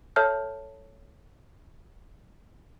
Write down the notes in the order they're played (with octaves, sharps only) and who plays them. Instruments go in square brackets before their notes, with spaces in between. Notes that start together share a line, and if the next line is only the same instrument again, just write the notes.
[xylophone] A4 C#5 E5 A5 F6 G6